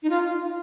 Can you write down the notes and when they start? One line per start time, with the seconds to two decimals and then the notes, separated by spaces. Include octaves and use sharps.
0.03 D#4
0.10 F4